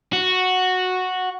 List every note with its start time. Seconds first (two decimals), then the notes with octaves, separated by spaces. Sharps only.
0.13 F#4